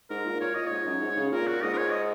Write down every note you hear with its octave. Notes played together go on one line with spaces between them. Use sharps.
G#2 A#4
A#2
A#2 C#5
A#2 D#5
G#2 C#5
F#2
G#2
C#3
A#2 A#4
F#4
G#2 D#5
A#4
C#5
D#5